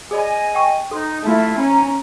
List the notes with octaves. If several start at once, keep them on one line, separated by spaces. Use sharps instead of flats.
G#4 D5 D#5 G#5 B5
G5 C#6
D#4 A4 C6
A3 E4 F4
C#4 A#5